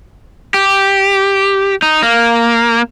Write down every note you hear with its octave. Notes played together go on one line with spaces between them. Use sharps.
G4
D#4
A#3